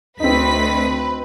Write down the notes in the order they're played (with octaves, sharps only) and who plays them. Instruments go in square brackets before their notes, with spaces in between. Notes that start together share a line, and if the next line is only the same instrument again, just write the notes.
[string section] D2 B6 [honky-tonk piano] C4 D#4 [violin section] B4